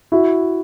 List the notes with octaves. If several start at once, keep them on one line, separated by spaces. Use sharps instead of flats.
E4 F#4